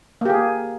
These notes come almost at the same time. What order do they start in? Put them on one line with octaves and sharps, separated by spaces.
A#3 G4 G#4